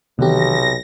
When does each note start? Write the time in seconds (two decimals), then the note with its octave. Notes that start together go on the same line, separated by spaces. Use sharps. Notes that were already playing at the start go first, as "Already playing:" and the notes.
0.19 B1 C3 D#3 E3 B3 G4 A#6